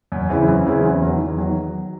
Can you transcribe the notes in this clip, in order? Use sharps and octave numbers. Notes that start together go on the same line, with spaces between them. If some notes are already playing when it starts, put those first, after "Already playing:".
F#2
C#3 E3 C4 E4
F#2
C#3 E3 C4 E4
E2
D#3 F#3
E2
D#3 F#3